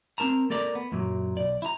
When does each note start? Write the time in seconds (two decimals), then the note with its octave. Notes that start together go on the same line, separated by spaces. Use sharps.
0.18 C4 D4 A#4 A5 A#5
0.50 A#3 A4 A#4 D5
0.75 B3
0.92 F#2 A#2 F#3
1.37 B1 D5
1.62 E4 A#5